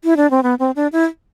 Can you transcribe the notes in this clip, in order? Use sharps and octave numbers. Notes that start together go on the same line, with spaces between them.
E4
D4
C4
B3
C4
D4
E4